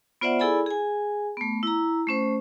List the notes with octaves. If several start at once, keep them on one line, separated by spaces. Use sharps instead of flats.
B3 F4 C5 D5 E5 F#5
E4 G#4 A4 D5 G#5 B5
G#4 G#5
A3 B3
E4 A#5
A3 C#4 C5